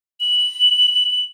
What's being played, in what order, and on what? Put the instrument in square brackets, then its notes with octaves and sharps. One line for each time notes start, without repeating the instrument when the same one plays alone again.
[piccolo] F#7